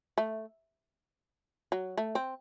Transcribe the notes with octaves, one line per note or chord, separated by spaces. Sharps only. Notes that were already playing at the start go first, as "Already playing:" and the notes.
A3
F#3
A3
C4